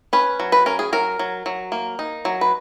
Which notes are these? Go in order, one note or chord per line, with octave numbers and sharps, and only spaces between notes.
C#4 B4
F#3
B4
C#4 A#4
G#4
F#3 A#4
F#3
F#3
A#3
D#4
F#3
B4